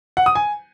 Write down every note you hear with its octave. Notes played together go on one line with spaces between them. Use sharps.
F#5
D#6
G#5